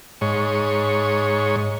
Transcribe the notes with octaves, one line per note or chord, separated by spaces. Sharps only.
G#2 C#5